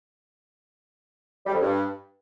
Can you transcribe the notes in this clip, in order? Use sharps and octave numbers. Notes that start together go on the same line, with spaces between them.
G3
F2
G2